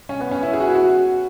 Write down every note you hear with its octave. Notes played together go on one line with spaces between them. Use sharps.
C#4
B3
C#4
E4
G#4
F#4
E4
F#4